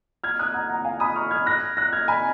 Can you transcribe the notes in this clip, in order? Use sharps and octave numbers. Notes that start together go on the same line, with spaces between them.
F6 G#6
D#6 F#6
F#5 A#5
F#5 A#5
F5 G#5
B5 D#6
C#6 F6
F6 G#6
F#6 A#6
F#6 A#6
F6 G#6
G#5 B5